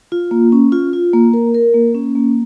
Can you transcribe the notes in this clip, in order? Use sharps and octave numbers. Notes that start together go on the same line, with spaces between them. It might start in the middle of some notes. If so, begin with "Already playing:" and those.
F4
A#3
C#4
F4
F4
A#3
A#4
A#4
A#3
C#4
A#3